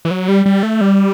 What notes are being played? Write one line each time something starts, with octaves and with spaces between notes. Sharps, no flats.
E3
F#3
G3
G3
A3
G3